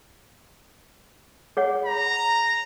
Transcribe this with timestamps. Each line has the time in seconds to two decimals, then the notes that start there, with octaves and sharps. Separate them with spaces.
1.57 G#4 C#5 F#5
1.85 A#5